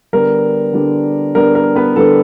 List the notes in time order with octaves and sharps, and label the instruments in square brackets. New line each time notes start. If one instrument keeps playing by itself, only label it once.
[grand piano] D3 G3 B3 D4 A#4
D3 G3 B3 D4
D3 G3 B3 D4 A#4
A#4
B3 B4
D3 G3 B3 D4 A4